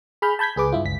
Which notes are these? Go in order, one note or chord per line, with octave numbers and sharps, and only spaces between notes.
G#4 B5 F6 G6
A5 B5 G6 G#6 B6
C#2 G#4 B4 D6
G2 E4 F4
G1 C#2 B6